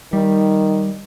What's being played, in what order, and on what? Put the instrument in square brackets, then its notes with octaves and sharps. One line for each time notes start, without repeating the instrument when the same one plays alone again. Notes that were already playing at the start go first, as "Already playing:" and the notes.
[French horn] D#3 [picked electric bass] G3